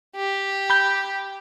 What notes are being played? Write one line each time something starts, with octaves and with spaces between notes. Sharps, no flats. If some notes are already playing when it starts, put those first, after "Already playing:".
G4
B5 G6